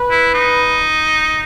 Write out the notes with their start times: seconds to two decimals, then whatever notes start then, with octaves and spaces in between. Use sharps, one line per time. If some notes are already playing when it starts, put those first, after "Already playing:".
Already playing: B4
0.11 E4
0.34 D#4